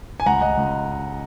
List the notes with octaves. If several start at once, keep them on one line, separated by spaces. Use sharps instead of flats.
G#5
C#2 F#5 A#5
C#2 D#5 F#5
C#2